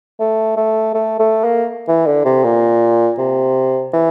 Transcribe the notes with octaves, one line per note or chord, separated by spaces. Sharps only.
A3
A3
A3
A3
A#3
E3
D3
C3
A#2
C3
E3